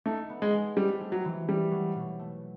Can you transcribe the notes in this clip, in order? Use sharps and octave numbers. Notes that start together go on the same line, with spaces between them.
A3 D#4
B3
G#3
G#3
G3 C4
A3
F#3
E3
G3 A3
F#3
B2
A3